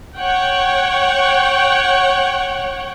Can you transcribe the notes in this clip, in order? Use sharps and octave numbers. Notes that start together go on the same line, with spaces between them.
C#5 F#5 G5